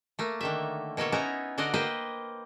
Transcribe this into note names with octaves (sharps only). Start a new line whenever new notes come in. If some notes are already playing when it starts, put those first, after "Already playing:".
A3 A#3
D3 D#3 E5
B2 A#3 A4 C#5
B3 C#4 D#4 E4 A#5
D3 F#4 D5 D#5 F5
A#3 B4 C5 D#5 G5